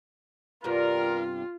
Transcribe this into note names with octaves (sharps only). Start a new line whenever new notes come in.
G2 C3 B3 F4 A#4